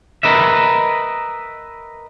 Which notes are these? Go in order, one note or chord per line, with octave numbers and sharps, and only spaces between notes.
A#4 B4 D#5 E5